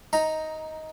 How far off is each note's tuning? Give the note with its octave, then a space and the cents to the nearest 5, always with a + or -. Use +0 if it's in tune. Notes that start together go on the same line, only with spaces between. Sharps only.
D#4 +15 A#5 +0